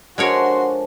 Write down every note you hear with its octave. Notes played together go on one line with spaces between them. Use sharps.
F3 G#3 D4 F#4 A4 A#4 C#5 C6